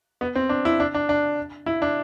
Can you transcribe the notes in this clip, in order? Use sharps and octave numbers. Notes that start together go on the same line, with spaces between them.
B3
C4
D4
E4
D4
D4
D4
E4
D4